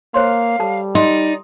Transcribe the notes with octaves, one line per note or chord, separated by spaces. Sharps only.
A#3 C5 C#5 F5 C6
G3 A4 A5
D#4 D5 C6